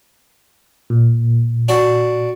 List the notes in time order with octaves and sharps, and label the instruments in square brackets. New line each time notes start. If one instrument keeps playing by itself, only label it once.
[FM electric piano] A#2
[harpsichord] D4 F#4